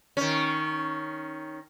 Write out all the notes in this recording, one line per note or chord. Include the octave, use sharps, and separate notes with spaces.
D#3 C#4